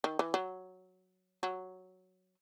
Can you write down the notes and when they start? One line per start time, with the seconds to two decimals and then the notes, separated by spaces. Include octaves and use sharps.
0.04 D#3
0.19 E3
0.34 F#3
1.43 F#3